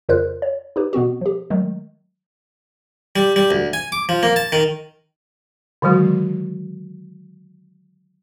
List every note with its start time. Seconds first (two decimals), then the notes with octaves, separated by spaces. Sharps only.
0.09 F2 C#3 F4 A#4 C5 F#6
0.42 C#5
0.76 D#4 G4 B4
0.93 B2 B3 C4 F#4
1.21 F3 G4
1.50 D#3 F#3 G#3 A3
3.16 G3
3.36 G3
3.51 D2
3.73 G#5
3.92 D6
4.09 F3
4.23 A#3
4.36 A5
4.52 D#3
5.82 D3 D#3 F#3 G#3 F#4